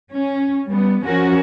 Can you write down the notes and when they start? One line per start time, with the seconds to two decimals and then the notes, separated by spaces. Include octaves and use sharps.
0.11 C#4
0.67 G3 B3
1.03 F3 C#4 F#4 A#4